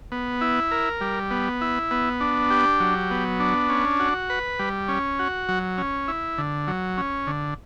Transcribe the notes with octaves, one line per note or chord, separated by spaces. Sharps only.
B3
E4
A#4
G3
B3
E4
B3
D4
G4
F#3
B3
D4
C#4
F#4
B4
G3
C#4
F#4
F#3
C#4
E4
D3
F#3
C#4
D3